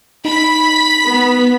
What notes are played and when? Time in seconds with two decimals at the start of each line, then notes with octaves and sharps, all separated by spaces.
0.25 D#4 B5 B6
1.08 B3